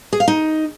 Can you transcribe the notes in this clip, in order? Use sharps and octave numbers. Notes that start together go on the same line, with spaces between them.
G#4
F5
D#4